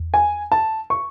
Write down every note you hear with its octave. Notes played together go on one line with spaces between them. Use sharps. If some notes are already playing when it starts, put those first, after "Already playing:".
Already playing: E2
G#5
A5
C#6